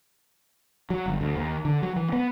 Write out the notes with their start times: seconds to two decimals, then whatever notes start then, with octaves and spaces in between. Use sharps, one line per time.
0.90 F#3
1.06 G1
1.21 D2
1.36 D#2
1.65 D3
1.82 F#3
1.96 E3
2.13 B3